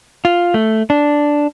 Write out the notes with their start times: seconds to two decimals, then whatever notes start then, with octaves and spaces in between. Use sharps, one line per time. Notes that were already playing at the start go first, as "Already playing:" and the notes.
0.25 F4
0.54 A3
0.90 D4